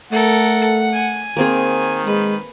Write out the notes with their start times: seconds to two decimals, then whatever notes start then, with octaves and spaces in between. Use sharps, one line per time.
0.12 A3 A4 A#4 F#5
0.93 G#5
1.37 D#3 A#3 C4 G#4
2.06 G#3 B4